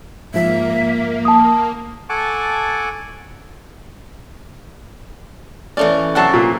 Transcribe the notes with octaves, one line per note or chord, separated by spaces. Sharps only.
G#2 F3 A#3 E5
A5 D#6
A4 F#5 G#5 A5 C#6 D6
E3 A3 C#4 D5
C3 F#3 C4 F#5 A5 C#6
A#2